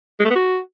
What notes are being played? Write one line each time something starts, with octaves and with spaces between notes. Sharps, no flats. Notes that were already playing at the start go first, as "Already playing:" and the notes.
G#3
A3
B3
F#4